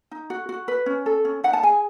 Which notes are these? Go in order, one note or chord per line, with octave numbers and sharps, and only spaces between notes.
D#4
F#4
F#4
B4
C#4
A4
C#4
D#4 F#5
A5
G#4 G#5